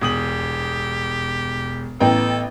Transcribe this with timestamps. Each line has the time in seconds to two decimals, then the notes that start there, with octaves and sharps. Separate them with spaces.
0.01 E1 G4 D#6 F#7
2.00 A1 B3 A4 G5 A#5